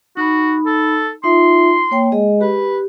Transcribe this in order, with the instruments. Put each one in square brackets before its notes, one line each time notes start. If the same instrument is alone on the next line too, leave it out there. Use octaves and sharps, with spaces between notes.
[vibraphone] D#4 B5 [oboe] F#4
[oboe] A4
[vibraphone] D#4 F4 E5 [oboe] C6
[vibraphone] A#3 C#5 G5
G#3 G#4 D#5
[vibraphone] G4 [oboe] B4